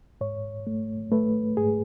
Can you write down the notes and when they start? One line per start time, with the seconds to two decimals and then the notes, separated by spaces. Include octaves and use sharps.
0.21 G#2 C#5
0.67 A3
1.12 A3 B4
1.57 G#2 G#4